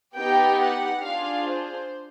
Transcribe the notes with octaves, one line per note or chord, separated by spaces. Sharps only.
B3 D#4 G4 G5
F#5
D4 F4 G#4 F5
C5